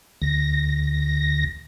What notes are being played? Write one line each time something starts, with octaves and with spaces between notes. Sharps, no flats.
D2 A#6